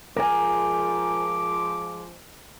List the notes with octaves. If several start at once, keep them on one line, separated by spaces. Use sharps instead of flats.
F3 G#3 A#4 G#5 D6